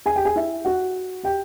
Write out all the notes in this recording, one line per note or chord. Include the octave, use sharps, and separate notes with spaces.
G#4 G#5
G4 G5
G#4 G#5
E4 E5
F#4 F#5
G4 G5